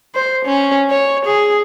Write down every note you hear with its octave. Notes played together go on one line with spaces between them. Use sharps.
C5
C#4
C#5
G#4